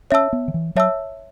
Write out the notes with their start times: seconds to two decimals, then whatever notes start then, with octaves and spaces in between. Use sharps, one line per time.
0.11 C#4 C#5 E5 A5 E6
0.33 B3
0.48 D#3
0.54 E3
0.75 F#3 C#5 E5 A5 E6